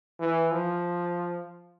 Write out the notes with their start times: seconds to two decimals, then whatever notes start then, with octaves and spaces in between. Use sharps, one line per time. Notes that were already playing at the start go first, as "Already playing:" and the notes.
0.20 E3
0.51 F3